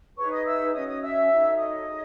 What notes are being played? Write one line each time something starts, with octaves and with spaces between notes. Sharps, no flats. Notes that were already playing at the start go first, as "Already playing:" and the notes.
D#4 G#4 B4 C#5 C#6
D#5 D#6
E5 E6
C#4 F#4 C#5 D#5 D#6
D#5 D#6
E5 E6
D#4 F#4 A4 C#5
D#5 D#6
D#4 G#4 C#5